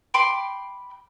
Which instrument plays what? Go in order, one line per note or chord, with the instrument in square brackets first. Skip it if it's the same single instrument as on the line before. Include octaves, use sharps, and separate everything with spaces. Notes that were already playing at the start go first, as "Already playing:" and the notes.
[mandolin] G5 B5 C6 D6